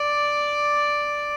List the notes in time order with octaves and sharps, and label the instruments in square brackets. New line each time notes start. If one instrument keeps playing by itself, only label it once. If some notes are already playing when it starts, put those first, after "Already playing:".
Already playing: [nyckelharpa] D5